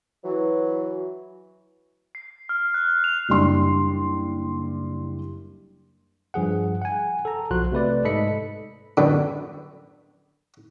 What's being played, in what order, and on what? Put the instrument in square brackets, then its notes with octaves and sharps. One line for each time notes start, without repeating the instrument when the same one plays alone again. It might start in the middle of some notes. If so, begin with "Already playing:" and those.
[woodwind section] E3 F#3
[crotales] C7
F6
F#6
F7
[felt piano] F#1 G3 D4 C6
[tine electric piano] G2 F3 G#4 F#5
F#5 G#5
A4 A#5
B1 F3 F#4 C6 F#6
C3 A3 B4 D5
G#2 A4 D#5 B5 B6 C#7
[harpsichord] F#2 B2 D3